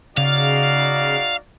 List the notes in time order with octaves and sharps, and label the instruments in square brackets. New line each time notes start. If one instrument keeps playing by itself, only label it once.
[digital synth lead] C#3 [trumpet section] D#4 F#4 D5 [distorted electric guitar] F5